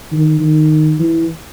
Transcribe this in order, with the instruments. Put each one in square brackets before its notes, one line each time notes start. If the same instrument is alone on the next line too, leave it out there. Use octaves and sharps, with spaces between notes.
[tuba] D#3
D#3
E3